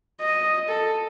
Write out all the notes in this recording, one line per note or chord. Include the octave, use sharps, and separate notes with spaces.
D#5
A4